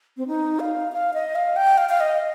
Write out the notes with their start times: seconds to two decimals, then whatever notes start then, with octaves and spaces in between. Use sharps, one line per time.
0.17 C4
0.28 D#4
0.60 F5
0.93 F5
1.14 D#5
1.35 F5
1.56 G5
1.78 F5
1.89 F5
2.00 D#5